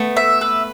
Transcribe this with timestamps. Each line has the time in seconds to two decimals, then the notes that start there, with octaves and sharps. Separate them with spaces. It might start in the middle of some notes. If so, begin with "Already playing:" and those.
Already playing: A3 B3
0.17 E5
0.41 B4